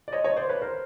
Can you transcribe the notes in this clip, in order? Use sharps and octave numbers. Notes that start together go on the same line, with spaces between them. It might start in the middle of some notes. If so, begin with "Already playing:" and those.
D5
C#5 D#5
C#5 D#5
C5 D5
B4 C#5
A#4 C5